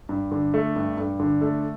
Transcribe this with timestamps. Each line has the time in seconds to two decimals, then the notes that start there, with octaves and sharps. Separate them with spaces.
0.09 G2
0.31 D3
0.54 A3
0.75 G2
0.97 G2
1.20 D3
1.41 A3